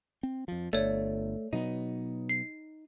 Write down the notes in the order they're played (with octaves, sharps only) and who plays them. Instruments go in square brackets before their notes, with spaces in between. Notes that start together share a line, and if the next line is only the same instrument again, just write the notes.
[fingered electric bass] C4
F2 F3
[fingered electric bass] G1 [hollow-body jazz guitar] A3 [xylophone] C#5 D5
[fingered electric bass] B2 F#3 B3 [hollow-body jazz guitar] D#4
[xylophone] C7